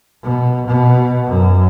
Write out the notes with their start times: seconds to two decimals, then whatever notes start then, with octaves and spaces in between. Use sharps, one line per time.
0.23 B2
0.67 B2
1.27 F#2